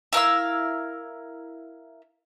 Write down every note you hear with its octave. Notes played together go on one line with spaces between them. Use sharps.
E4 A#4 F5 E6